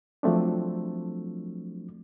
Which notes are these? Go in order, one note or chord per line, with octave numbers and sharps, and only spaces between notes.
F3 F#3 A3 C4 D4